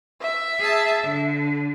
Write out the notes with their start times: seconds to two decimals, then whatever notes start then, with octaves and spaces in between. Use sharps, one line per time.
0.21 E5
0.59 G#4 A5
1.03 D3